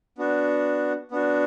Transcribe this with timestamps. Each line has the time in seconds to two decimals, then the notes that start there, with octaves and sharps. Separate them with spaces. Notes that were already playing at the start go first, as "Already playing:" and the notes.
0.18 B3 D4 F#4
1.11 B3 D4 F#4